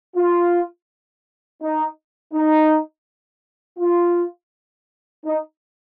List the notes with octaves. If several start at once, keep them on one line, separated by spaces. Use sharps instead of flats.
F4
D#4
D#4
F4
D#4